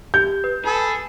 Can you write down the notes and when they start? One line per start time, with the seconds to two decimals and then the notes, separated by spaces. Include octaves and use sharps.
0.14 G4 G6
0.44 B4
0.65 G#4 A4 B5